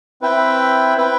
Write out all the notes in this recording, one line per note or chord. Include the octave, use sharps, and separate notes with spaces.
C4 E4 B4 E5 G5
C4 E4 B4 E5 G5